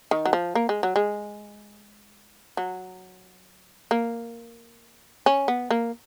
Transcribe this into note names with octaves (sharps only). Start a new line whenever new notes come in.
D#3
F#3
F3
A#3
G#3
F#3
G#3
F#3
A#3
C#4
B3
A#3